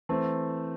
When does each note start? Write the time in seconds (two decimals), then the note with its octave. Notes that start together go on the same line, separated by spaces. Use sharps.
0.09 E3 A3 C4